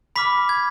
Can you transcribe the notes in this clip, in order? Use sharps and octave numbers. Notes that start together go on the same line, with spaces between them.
B5 D6 F6 B6
G#6